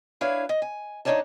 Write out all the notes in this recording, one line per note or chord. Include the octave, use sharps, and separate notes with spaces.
D4 E4 B4 C#5 F5
D#5
G#5
D#2 D4 D#4 C#5 D5 A5